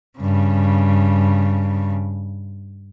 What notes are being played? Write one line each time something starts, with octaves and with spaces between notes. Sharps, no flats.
G2 C#3